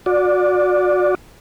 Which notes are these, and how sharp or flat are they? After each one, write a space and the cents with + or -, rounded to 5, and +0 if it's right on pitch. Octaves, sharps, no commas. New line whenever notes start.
F#4 -30 D5 +0